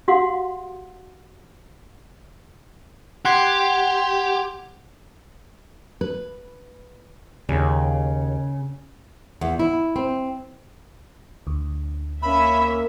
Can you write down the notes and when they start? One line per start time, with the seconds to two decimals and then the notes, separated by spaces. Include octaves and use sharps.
0.08 F#4 G4 F5 F#5 C6
3.25 G4 F#5 C6 G#6
6.01 B4
7.49 D#2 C#3
9.41 E2
9.59 E4
9.96 C4
11.47 D2
12.22 A#3 C#4 E5 B5